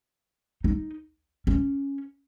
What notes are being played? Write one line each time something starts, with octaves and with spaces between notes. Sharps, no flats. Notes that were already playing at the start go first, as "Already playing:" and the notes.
D#4
C#4